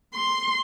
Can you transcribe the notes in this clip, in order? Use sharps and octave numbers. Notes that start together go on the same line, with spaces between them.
C6